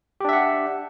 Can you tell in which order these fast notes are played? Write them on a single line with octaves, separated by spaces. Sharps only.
G4 D4 E5 F#5